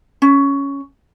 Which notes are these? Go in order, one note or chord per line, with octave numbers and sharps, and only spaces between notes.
C#4